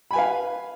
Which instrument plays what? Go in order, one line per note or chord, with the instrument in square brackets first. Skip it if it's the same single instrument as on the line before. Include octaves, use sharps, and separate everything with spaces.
[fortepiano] B5
G#5
B4
F5